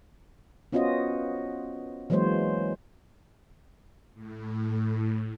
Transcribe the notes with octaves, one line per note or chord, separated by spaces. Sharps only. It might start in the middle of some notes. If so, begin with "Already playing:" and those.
B3 C#4 F4 F#4 C5 D#5
E3 F#3 G#3 A#3 C5 C#5
A2